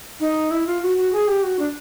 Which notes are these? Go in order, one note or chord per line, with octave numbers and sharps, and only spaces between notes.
D#4
E4
F4
F#4
F#4
G#4
G4
F#4
D4